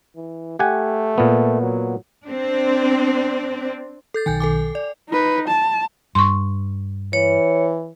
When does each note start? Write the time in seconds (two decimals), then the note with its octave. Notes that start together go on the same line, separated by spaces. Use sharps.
0.16 E3
0.59 A3 G4 F#5 G#5
1.18 A#2 B3
1.62 F#3
2.24 C4 D4
4.14 A4 G6 A6
4.26 B1 D#3 G5 G#5 G6
4.40 A4 G#5 D6
4.75 D5
5.09 D#4 B4
5.48 A5
6.15 G2 C6 C#6
7.13 E3 C#5